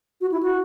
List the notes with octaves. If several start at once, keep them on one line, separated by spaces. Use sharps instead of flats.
F#4
E4
F#4